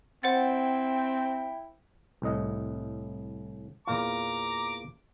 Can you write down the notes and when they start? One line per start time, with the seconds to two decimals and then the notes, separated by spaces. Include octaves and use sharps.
0.23 C4 E4 C5 F#5 G5 A6
2.22 C2 A2 D#5
3.87 E2 A#2 F4 A#5 D6